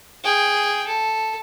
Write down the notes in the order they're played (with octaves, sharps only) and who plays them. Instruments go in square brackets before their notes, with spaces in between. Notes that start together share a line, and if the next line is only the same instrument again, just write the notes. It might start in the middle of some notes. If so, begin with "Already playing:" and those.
[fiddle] G#4 G5
A4